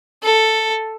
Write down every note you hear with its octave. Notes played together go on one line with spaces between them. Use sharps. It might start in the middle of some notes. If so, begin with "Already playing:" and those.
A4